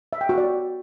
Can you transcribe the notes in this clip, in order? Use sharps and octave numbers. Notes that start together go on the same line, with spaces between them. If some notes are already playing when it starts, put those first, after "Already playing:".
E5
G5
F#4
D5